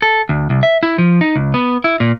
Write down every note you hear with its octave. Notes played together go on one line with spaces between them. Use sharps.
A4
D2
C2
E5
E4
F3
D#4
C#2
B3
E4
A#2